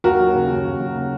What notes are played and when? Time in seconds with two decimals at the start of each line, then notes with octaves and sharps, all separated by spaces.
0.04 D#2 F#4 A#4
0.19 F#3
0.35 C#3
0.50 D#2
0.65 D#2
0.80 F#3
0.97 C#3